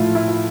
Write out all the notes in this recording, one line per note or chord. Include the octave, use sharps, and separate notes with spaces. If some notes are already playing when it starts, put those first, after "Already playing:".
Already playing: A2 F3 A3 E4 F4
E4
F4